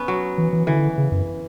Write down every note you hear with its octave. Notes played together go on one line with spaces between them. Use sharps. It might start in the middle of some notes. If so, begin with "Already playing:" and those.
Already playing: B3 C#4
F#3
E3
E3
D3 E3
C#3
F#2